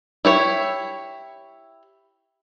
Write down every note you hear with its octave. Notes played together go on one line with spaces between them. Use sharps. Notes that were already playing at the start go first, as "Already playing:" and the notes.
E4 G4 C#5